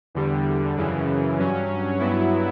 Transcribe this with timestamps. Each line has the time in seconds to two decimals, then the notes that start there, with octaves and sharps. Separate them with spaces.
0.15 E2 D3 G3
0.77 F#2 C#3 E3
1.38 G2 F#3 C#4
1.99 G2 F#3 B3 E4